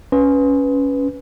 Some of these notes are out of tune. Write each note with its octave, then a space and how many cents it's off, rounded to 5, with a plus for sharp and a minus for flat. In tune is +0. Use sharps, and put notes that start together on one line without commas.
C#4 +5 B4 +0